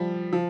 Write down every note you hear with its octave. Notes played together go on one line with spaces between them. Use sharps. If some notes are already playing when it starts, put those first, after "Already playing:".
Already playing: F3 G3
F3